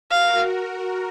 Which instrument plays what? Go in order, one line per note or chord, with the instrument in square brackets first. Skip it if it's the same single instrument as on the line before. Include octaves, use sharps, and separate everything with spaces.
[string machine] F#4 A#4 [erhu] F5